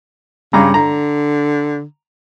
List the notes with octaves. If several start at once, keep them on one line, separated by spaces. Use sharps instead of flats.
G2 C#3 A#5 D6
D3 A#5